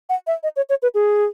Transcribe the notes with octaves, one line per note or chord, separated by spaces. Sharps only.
F#5
E5
D#5
C#5
C#5
B4
G#4